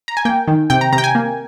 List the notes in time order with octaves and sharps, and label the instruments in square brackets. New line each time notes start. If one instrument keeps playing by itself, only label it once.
[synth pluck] A#5
G#5
A#3 G5
D#3
C3 G5
A#5
C3 A#5
G5
G#5
A#3